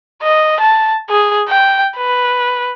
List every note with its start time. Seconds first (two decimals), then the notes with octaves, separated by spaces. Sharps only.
0.22 D#5
0.60 A5
1.10 G#4
1.49 G5
1.97 B4